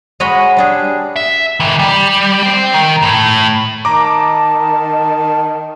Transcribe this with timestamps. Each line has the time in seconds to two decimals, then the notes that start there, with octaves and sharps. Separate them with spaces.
0.20 G#3 F#4 C#5 D#5 B5
0.57 G3 D4 G#4
1.16 E5
1.60 D#3 E3
1.79 G3
2.43 C5 G5
2.74 D#3
3.02 A2
3.85 D#3 D#5 A5 A#5 D6